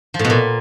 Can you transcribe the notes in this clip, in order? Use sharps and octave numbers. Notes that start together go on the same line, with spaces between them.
F3
A2
B2
A#2